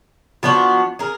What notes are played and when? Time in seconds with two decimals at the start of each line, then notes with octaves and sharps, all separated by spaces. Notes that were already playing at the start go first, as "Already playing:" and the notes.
0.43 F3 B3 D4 F#4
0.99 G#4 A#4